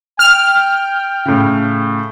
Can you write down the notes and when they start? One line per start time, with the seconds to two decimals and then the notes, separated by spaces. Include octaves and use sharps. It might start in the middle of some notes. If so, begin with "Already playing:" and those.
0.19 G5 F6
1.25 A2 C#3